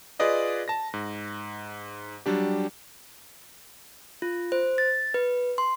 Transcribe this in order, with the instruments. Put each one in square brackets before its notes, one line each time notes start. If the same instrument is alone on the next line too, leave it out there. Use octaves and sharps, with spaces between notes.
[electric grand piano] F4 G#4 B4 D5 D#5 F5
A5 A#6
G#2
F#3 G3 D4 G4
[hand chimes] F4
C5
A6
B4
C6